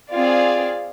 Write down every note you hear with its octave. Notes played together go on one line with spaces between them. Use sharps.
C4 F4 G#4 D5 F5